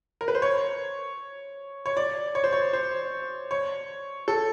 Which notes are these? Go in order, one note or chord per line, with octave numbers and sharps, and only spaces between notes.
A#4
B4
C5
C#5
C#5
D5
C#5
C5
C#5
C5
C#5
A4